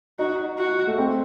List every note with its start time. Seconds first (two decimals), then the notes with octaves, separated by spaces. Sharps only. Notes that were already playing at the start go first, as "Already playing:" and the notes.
0.19 D#4 F#4
0.58 F#4
0.87 A3
0.98 C4